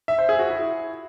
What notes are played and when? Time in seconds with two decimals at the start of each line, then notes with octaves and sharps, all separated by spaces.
0.08 E5
0.18 C5
0.29 G#4
0.39 F#4
0.50 E4